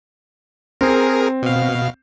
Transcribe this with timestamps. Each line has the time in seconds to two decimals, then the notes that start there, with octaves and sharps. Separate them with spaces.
0.81 C4 G#4 A#4
1.42 B2 F5